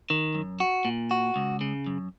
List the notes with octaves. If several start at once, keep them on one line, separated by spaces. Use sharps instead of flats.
D#3
F#2
F#4
A#2
F#4
C#2
C#3
F#2